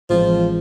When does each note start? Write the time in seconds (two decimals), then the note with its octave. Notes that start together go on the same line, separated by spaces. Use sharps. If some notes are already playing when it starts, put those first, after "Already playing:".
0.10 A1 A2 E3 F3 G#3 C4